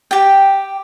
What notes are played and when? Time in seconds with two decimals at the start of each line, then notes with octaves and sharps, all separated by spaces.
0.11 G4 G5